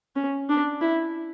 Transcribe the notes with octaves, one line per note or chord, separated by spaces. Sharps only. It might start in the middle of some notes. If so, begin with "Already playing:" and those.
C#4
D4
E4